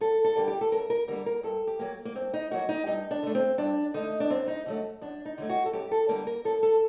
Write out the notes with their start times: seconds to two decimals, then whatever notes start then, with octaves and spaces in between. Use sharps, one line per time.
0.01 F#2 A4
0.24 A4
0.36 D3 G3 A#3
0.48 G4
0.61 A4
0.72 F#2 A#4
0.90 A#4
1.08 D3 G3 A#3 A#4
1.26 A#4
1.43 G2 A4
1.67 G4
1.79 F#3 A#3
2.05 A#3
2.15 G2 C4
2.34 D#4
2.51 F#3 A#3 F#4
2.69 D#4
2.86 G2 D#4
3.11 D4
3.23 D3 A3
3.35 C4
3.58 G2 D4
3.94 D3 A3 D#4
4.20 D4
4.30 F#2 C4
4.48 D#4
4.66 D3 F#3 A3
5.01 F#2 D4
5.25 D#4
5.38 D3 F#3 A3
5.49 F#4
5.65 A4
5.73 F#2 G4
5.91 A4
6.09 D3 G3 A#3 A#4
6.27 A#4
6.45 F#2 A4
6.63 A4